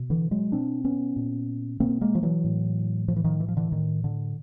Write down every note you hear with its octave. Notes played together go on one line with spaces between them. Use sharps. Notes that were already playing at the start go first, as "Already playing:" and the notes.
Already playing: B2
D3 E3
F#3 G#3
B2 C4 D4
B3 C#4
A#2
B2 A#3 C4
G#3 A#3
F3
E3 F#3
A2
A2 F3
E3
D#3 F3
E3
F3
D3 E3
A2 D#3
D3